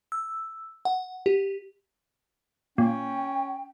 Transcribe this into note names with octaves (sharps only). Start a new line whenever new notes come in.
E6
F#5
G4
A#2 C#4 G5